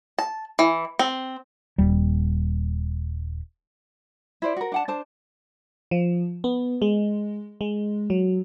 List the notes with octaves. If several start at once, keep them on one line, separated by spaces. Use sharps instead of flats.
A5
E3
C4
D#1 G3
E4 C5 D5
F#4 A#4
D4 F#5 A5
D4 C5 A5
F3
B3
G#3
G#3
F#3